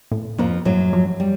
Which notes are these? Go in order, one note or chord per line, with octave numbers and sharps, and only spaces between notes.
A2
F2 F3 A#3
F#2 A2 F#3
F3
G3